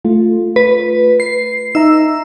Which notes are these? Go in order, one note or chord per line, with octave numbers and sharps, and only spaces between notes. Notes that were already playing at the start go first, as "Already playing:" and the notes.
A3 F4
B4
C7
D#4 E5 A#5 E6